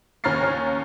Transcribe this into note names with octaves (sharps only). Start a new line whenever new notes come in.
D#2 C#4 A#5 F6 A6 C7